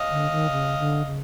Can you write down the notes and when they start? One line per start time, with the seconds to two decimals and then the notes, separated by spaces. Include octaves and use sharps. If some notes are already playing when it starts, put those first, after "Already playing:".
Already playing: D#5 F5
0.10 D3
0.31 D#3
0.51 C#3
0.79 D3
1.06 C#3